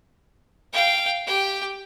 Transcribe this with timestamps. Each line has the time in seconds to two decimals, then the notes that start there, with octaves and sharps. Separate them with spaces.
0.73 F5 G5
1.27 G4 G5